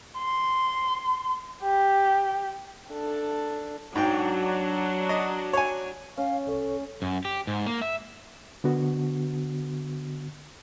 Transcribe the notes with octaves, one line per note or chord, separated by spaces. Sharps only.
C6
G4
D4 A4
G#2 F#3 D4 G5
D#5
C#5 G#5
C#4 F5
C2 A4 C#5
F#2
G4
G#2
A#3
E5
D3 B3 F#4